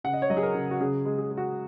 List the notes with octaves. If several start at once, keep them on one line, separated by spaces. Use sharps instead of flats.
C#3 F#5
D#5
C#5
F#3 D#5
G#4
A#4
C#3
F#4
C#3 G#4
G#3
G#4
G#3
F#4